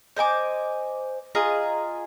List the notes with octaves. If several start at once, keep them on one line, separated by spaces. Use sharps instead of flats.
C5 D#5 G#5 D6
F4 G#4 D#5 A#5